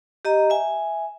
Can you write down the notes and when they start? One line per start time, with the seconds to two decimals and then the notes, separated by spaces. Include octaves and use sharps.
0.25 G4 D#5 A#5
0.50 E5 G#5